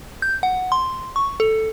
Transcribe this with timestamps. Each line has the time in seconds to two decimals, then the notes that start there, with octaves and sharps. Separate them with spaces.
0.22 G6
0.43 F#5
0.72 C6
1.16 C#6
1.40 A4